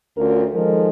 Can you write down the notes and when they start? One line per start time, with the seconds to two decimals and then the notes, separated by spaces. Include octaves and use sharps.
0.17 D2 C#4 F4 A#4
0.54 D#3 F3 G#3 A4 A#4